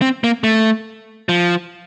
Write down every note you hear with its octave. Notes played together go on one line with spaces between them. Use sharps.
C4
A#3
A3
F3